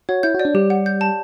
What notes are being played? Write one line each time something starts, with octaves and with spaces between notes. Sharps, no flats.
F#4 C#5
E4 G6
F#4
D5
D4
G3 G4
F#5
G6
A5